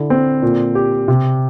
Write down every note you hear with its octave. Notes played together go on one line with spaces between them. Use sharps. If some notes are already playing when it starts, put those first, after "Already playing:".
Already playing: D3 E4
C4
A#2
G4
C3